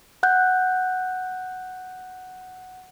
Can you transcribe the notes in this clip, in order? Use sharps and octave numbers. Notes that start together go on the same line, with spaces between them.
F#5 F#6 G6